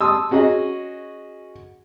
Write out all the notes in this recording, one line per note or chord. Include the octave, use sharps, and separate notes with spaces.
A5 C6 D#6 E6
C#4 F#4 G#4 D#5